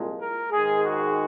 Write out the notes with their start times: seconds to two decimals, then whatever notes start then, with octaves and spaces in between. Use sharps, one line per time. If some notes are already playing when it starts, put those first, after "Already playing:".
Already playing: C2 A#2 F3 G#3
0.20 A#4
0.52 G#2 D#3 G#3 G#4
0.84 F#4